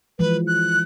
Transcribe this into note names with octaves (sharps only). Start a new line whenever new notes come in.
E3 F3 G#3 B4
F#6